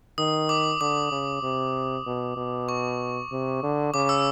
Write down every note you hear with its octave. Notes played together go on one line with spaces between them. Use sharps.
D#3 D#6
D6
D3 D6
C#3
C3
B2
B2
C#6
C3
D3
C#3 D6
E6